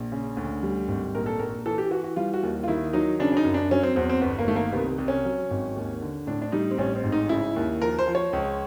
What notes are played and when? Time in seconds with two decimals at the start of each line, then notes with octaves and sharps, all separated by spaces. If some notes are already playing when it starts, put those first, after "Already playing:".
Already playing: A#1
0.12 C#3
0.37 D2
0.63 G3
0.88 G#1
1.15 A#1 A#4
1.26 A4
1.39 A#1 A#4
1.66 E3 A4
1.78 G4
1.91 E3 F#4
2.04 F#4
2.16 G3 F4
2.34 F#4
2.43 D#2
2.63 F4
2.68 D#3 E4
2.93 F#3 D#4
3.20 C#3 D4
3.32 D4
3.37 D#4
3.45 F#2
3.54 D4
3.71 F#3 C#4
3.83 C4
3.96 E2 C4
4.09 C4
4.22 G1 B3
4.39 A#3
4.47 D#3 A3
4.56 A#3
4.73 C2 B3
4.98 C2
5.08 C#4
5.25 F#3
5.51 G#1
5.76 D#2
6.02 D3
6.27 A2 D4
6.42 D4
6.52 G3 D#4
6.71 C4
6.78 A1 C#4
6.96 C4
7.04 G#2
7.12 D#4
7.29 C#3 E4
7.56 D#2
7.81 F3 A#4
7.99 C5
8.07 F3
8.15 C#5
8.33 C#2